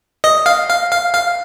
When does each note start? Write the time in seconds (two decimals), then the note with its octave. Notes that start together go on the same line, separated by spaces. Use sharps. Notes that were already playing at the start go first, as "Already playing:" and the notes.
0.24 D#5
0.46 F5
0.69 F5
0.91 F5
1.14 F5